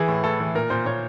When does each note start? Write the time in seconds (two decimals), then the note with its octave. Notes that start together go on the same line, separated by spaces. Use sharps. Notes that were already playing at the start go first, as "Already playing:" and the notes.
Already playing: E3 G#4
0.08 A2
0.24 A2 A4
0.40 E3
0.55 A#2 A#4
0.70 A#2 C5
0.86 A#2 C#5